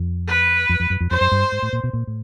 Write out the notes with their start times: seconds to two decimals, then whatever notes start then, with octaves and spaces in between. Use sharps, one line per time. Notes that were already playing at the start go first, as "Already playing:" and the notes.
Already playing: F2
0.28 B4
0.69 F2
0.80 F2
0.90 F#2
1.00 F2
1.11 F2 C5
1.21 F#2
1.32 G2
1.52 G#2
1.62 A2
1.73 A#2
1.84 B2
1.93 A#2
2.07 A2